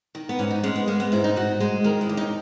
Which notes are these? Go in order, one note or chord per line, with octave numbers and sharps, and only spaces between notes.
D#3
B3
G#2 C#4
D#4
G#3 C#4
B3
G#3 A#3
B3
G#2 E4
D#4
G#2 F#4
G#3
D#3 A#4
E4
D#2
D#4